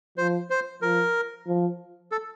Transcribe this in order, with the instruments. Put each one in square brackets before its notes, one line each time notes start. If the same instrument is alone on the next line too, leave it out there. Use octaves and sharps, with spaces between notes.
[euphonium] F3 [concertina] C5
[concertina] C5
[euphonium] F3 [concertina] A#4
[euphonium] F3
[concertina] A4